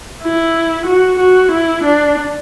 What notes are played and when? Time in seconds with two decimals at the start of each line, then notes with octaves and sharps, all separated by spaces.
0.23 E4
0.86 F#4
1.19 F#4
1.52 E4
1.84 D4